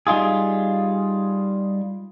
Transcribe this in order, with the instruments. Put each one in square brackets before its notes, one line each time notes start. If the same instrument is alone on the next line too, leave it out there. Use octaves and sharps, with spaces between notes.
[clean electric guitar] G3 D#4 F4 G#4